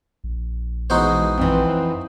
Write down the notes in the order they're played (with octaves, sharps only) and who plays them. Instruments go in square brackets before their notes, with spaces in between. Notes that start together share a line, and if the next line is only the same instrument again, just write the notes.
[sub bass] A#1
[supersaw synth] B2 E3 G#3 [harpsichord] D#4 F#4 C5
[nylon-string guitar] F2 E3 [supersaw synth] C4